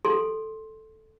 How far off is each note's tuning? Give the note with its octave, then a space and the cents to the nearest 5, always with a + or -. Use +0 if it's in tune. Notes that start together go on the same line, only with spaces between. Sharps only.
A4 +0 C6 +10